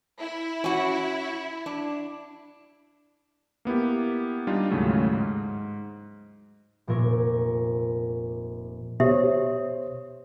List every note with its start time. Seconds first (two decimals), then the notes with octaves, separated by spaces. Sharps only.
0.20 E4
0.64 C#4 F#4
1.66 D4
3.65 A#3 B3 E4 G4
4.47 G3 D4 D#4 F4
4.71 D#2 A2 C#3 F#3 G#3 A3
5.12 G#2
6.88 F1 A#2 A#4 C#6
9.00 B2 G4 C5 C#5 E5 D#6